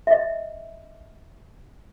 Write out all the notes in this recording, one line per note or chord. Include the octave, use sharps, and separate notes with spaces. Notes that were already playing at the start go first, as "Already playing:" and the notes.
D#5 E5